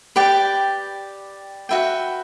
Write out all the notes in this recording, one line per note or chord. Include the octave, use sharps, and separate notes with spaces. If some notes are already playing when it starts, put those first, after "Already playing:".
G4 B4 D5 G5
F#4 B4 E5 G5